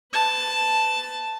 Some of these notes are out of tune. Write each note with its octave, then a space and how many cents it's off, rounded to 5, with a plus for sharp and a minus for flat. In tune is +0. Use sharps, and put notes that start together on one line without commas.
B4 +30 A5 +0